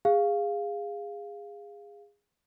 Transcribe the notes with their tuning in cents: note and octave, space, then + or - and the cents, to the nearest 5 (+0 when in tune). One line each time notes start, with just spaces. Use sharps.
G#4 -20 F5 +0